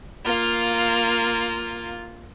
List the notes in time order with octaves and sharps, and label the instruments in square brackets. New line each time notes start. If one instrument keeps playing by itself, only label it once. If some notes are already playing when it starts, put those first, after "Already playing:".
[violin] A#3 F4